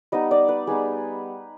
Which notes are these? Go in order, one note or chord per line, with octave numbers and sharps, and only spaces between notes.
G3 B3 D#4 D#5
D5
B4
G3 B3 D#4 G#4